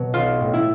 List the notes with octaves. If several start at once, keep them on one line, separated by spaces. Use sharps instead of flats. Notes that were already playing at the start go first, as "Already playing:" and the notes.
Already playing: B2 F#3
B1 F4
A2
E4